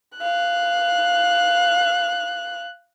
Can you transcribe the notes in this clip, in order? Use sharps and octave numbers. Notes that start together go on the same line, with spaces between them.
F5 F#6